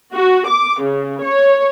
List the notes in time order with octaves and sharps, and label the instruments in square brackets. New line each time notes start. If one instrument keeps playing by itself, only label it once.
[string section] F#4
D6
C#3
C#5